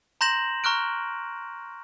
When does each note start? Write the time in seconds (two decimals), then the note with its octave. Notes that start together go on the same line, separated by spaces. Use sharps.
0.21 A#5 C6 G6 A#6 E7 F#7
0.64 A#5 C#6 F6 F#6 D7